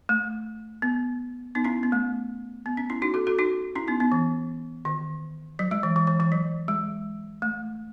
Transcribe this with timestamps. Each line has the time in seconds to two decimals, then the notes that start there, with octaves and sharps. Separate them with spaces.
0.09 A3
0.82 B3
1.55 B3 D#4
1.64 C#4 E4
1.83 B3
1.92 A3
2.66 B3
2.77 C#4
2.90 C#4 E4
3.02 D#4 F#4
3.14 F#4 A4
3.27 F#4 A4
3.39 D#4 F#4
3.75 C#4 E4
3.88 B3 D#4
4.00 B3 D#4
4.12 E3
4.85 D#3
5.59 F#3
5.71 G#3
5.83 E3
5.96 E3
6.07 E3
6.20 E3
6.32 F#3
6.68 G#3
7.42 A3